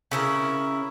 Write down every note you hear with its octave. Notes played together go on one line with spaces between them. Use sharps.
C#3 E4 G#4 A#4